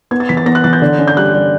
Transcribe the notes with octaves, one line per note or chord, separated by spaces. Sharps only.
B3 G#6
A6
E3 B6
A6
B3 A#6
F#6
E3 A6
G6
D3
C#4
G6
G3 F#6
G3